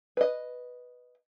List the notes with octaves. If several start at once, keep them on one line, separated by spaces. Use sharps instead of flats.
B4 D#5